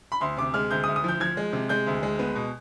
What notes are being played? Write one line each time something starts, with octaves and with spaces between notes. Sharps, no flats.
B5
D2 C6
C3 D6
G#3 F6
D2 G6
D#6
D2
D#6
F3 G6
F3 G#6
G#3
C3
G#3 G6
D2
G#3
B3
B2